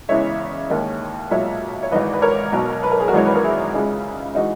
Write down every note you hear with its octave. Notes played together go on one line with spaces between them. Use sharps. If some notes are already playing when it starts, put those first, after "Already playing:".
E2 C#3 E3 G#3 C#5 E5
D#2 D#3 G#3
B1 A#2 G#3 C#5 E5
C#5
G#1 G#2 E3 B4 D#5
B4
A#4 C#5
B1 B2 F#3
B4
A#4
G#4
F#4 A#4
G#1 F#2 E3 G#3 C#5
B4
A#4
E4 G#4
C#2 C#3 G#3 E4 G#4
E3 G#3 D#4 F#4